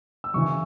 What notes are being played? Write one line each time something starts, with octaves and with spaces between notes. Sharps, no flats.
E6
F#2 C#3 E3 C#6